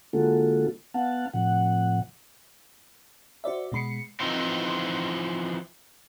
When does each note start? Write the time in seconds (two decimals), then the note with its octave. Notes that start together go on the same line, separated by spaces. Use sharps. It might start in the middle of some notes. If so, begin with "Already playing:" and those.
0.13 D3 G#3 A#3 F4 F#4 A4
0.94 B3 F5 F#5 A5
1.34 A2 C3 F3 F#5
3.44 F#4 C5 D5 E5
3.72 B2 G#3 B5 C7 C#7
4.20 E3 F3 C4 D#4 F4